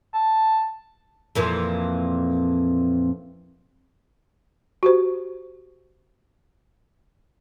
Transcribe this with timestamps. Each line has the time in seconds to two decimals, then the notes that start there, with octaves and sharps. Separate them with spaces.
0.14 A5
1.35 F2 A#2 E3
4.83 F#4 G4 C5